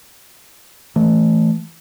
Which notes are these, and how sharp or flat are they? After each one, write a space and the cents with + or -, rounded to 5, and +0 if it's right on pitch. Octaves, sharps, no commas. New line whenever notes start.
E3 +0 A3 +0